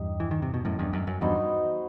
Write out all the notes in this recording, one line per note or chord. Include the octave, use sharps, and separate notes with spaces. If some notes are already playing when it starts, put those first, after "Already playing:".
Already playing: E2 G2 D#4 G4
E3
D#3
C3
B2
F#2 A2
E2 G2
F#2
F#2
E2 G2 B3 D#4 F#4 C5